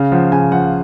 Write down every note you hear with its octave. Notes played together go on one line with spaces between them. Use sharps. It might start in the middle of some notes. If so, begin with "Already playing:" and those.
Already playing: C#3 F5
F3 F#5
C#3 G#5
F3 F#5